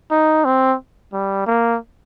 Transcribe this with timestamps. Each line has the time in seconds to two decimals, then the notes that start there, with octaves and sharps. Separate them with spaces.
0.11 D#4
0.45 C4
1.13 G3
1.47 A#3